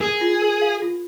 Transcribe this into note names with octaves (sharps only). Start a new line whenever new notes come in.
G#4 A#4
F4
A#4
F5
F4